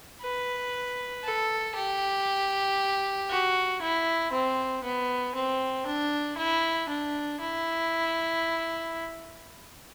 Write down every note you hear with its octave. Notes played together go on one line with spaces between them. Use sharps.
B4
A4
G4
F#4
E4
C4
B3
C4
D4
E4
D4
E4